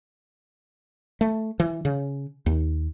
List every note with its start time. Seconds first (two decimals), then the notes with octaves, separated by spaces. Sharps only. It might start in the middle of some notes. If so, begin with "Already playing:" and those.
1.21 A3
1.60 E3
1.85 C#3
2.46 D#2